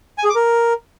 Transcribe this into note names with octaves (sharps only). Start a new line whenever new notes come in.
G#5
G#4
D6
A#4